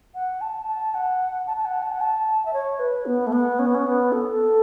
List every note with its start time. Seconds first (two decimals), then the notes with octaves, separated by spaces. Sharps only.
0.14 F#5
0.41 A5
0.68 A5
0.94 F#5
1.47 A5
1.57 A5
1.65 F#5
1.82 A5
1.92 F#5
2.01 A5
2.45 E5
2.53 C#5
2.79 B4
3.06 B3
3.26 A3
3.32 B3
3.59 C#4
3.66 B3
3.74 C#4
3.86 B3
4.12 A4